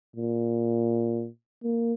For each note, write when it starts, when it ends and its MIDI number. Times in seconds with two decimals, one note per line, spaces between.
0.16 1.27 46
1.63 1.93 58